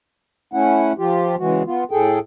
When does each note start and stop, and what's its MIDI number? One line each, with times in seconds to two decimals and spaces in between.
0.53 0.93 57
0.53 0.93 61
0.53 0.93 64
0.53 0.93 78
0.98 1.36 53
0.98 1.36 65
0.98 1.36 67
1.39 1.63 49
1.39 1.63 52
1.39 1.63 56
1.39 1.63 66
1.66 1.84 59
1.66 1.84 65
1.91 2.19 45
1.91 2.19 68
1.91 2.19 69
1.91 2.19 79